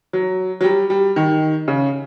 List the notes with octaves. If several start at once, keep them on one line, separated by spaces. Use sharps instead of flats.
F#3
F#3
G3
G3
D#3
C#3